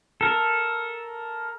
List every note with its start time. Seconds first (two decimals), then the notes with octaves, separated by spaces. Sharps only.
0.21 A4 A#4